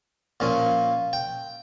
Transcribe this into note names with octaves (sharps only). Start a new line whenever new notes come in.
A#2 F3 C#4
G5